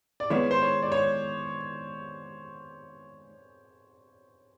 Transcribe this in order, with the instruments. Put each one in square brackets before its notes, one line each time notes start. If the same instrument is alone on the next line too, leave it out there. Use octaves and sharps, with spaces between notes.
[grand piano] D5
[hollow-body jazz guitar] D#3 G#3 B3 E4 [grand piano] C#5
[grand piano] C5
C#5
D5
C#5